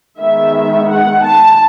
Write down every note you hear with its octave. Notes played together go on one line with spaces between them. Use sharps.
D#3 G#3 B3 E5
F#5
A5